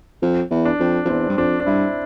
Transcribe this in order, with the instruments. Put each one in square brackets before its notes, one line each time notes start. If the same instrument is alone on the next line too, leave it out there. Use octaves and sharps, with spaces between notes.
[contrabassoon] F2
E2
[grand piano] D4
[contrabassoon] F2
F2
[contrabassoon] E2 [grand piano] C4
[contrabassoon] G2
[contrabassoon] F2 [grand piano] D4
[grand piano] D4
[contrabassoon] G2 [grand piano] E4